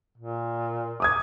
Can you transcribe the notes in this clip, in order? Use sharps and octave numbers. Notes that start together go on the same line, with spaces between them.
A#2
D6 D#6 G#6